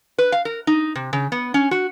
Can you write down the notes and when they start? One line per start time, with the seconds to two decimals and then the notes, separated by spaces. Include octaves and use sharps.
0.18 B4
0.32 F5
0.45 A#4
0.67 D#4
0.95 C3
1.13 C#3
1.32 B3
1.54 C#4
1.71 F#4